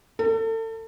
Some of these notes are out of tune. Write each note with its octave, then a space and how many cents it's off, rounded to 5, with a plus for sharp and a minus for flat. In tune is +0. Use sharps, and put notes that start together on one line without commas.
A4 +35